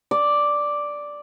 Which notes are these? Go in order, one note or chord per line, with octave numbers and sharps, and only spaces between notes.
D5